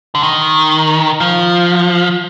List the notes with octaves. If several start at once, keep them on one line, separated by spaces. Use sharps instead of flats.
D3
D#3
F3